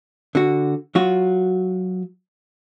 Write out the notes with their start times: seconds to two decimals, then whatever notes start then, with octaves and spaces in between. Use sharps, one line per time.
0.35 D3 F#4
0.95 F#3 F4 F#4